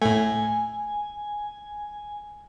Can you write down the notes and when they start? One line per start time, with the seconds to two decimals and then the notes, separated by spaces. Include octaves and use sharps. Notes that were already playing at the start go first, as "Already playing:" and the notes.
0.02 A2 A3 G#5